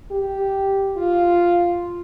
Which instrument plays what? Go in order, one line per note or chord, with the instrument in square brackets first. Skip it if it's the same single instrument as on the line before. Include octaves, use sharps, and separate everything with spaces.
[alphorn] G4
F4